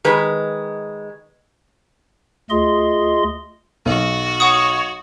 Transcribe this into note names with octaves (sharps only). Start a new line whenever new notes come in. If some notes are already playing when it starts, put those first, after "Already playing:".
D#3 G#3 B4
D2 A3 F4 G#4 D#5 C6
B1 F#4
C#5 F#5 C#6 D#6